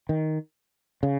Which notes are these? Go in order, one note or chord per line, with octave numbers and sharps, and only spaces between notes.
D#3
C#3